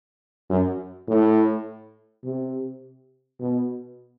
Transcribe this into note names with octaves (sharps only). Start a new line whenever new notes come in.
F#2
A2
C3
B2